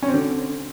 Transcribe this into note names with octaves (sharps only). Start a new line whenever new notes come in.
C#4
C4
D3